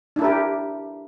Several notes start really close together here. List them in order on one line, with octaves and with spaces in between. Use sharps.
D4 E4 A#4 G4